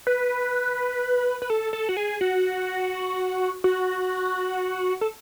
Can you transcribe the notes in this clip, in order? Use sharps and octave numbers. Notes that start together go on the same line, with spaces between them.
B4
B4
A4
A4
F#4
G#4
F#4
F#4
A4